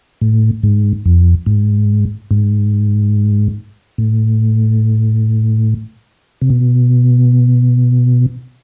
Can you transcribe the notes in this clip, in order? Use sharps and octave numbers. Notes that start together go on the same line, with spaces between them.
A2
G#2
F2
G#2
G#2
A2
C3
B2